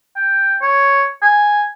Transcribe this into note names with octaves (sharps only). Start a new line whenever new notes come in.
G5
C#5
G#5